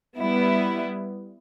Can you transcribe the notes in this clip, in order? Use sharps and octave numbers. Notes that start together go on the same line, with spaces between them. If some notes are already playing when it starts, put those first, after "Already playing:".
G3 B3 E4